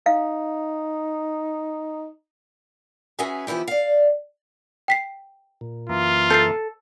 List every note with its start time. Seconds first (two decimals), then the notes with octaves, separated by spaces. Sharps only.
0.06 D#4 F5
3.19 C#4 F#4 G#4 B4 E5 G#5
3.47 E3 F3 B3 E4 G4
3.68 D5 F5
4.88 G5 B6 C7
5.61 A#2
5.89 F#2 E3 A#3 F4
6.30 A4 G6 A6 C7